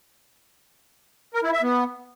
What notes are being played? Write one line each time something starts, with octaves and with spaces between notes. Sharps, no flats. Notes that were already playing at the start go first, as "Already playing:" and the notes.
A#4
E4
E5
B3